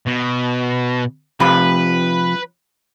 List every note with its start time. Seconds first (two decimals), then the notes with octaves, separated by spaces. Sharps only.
0.06 B2
1.40 C3 F3 B4 B5